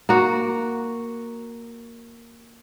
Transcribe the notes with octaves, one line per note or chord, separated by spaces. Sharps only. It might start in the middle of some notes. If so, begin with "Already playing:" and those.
A#3 F#4